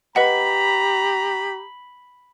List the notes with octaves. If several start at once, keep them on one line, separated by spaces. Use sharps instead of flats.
G4 B4 D#5 F#5 A#5 B5